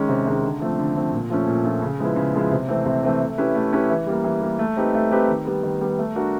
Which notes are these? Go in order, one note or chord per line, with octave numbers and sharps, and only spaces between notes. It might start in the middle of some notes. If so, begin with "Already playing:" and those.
Already playing: D#3 G#3 C#4
C3
D#3 G#3 C#4
D3
F3 A3 C4
D3
F3 A3 C4
A#2
F3 A3 C#4
A#2
F3 A3 C#4
C#3
F3 G#3 B3 E4
C#3
F3 G#3 B3 E4
C3
E3 A3 C4
C3
E3 A3 C4
A3
C#4 E4 G4 B4
A3
C#4 E4 G4 B4
E3
G3 A#3
E3
G3 A#3
A3
C4 D#4 G4 B4
A3
C4 D#4 G4 B4
D#3
G3 B3
D#3
G3 B3
A3
D4 F#4 A#4